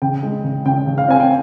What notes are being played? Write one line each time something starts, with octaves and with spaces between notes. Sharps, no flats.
C#3 G5
G#3
C#3
C#3 G5
C#3
F5
C4 G#5
G5